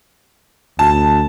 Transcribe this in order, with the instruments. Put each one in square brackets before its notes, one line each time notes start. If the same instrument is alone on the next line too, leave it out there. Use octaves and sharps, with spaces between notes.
[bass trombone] D2 [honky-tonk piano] A5